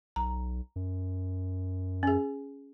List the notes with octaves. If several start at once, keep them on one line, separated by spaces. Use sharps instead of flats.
B1 A#5
F#2
C#4 G#4